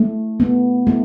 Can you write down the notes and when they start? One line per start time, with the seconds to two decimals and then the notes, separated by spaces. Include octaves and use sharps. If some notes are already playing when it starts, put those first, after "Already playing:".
Already playing: A3
0.40 B3
0.87 A3